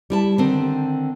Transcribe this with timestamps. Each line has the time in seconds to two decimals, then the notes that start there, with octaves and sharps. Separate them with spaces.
0.10 G3 E4 A5
0.38 D3 D#3 C4